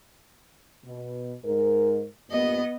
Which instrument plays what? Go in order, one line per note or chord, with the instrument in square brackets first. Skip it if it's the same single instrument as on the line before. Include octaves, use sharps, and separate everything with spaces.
[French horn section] B2
G#2 A#4
[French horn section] G2 A#2 [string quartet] B3 D#5